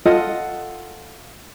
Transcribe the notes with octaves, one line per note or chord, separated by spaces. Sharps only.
F4 A4 D#5 F#5